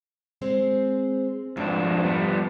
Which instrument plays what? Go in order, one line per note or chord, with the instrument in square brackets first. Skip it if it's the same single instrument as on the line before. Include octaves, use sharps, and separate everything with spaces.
[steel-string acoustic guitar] G#3 C4 C5
[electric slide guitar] F2 G#2 D4 [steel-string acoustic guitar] F3
[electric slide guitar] G3 B3